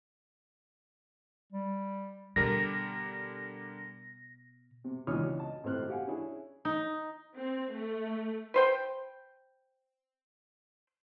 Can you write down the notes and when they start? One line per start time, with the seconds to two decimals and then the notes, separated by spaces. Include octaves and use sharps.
1.53 G3
2.36 B2 D3 G3 A#4 A#6
4.84 C3
5.07 C#2 E3 D4 C#5 D#6 F6
5.40 D#5 A5
5.64 G#1 A2 C3 C4 F6 F#6
5.89 G4 F5 F#5 G#5
6.07 C#4 D4 E4 G#4
6.65 D#4
7.37 C4
7.73 A3
8.54 B4 C5 G5